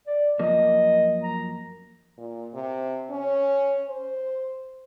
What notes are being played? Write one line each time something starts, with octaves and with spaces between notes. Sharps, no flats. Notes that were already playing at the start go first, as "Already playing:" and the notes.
D5
F#2 F3 A#3 D#5
A#5
A#2
C3
C#4
C5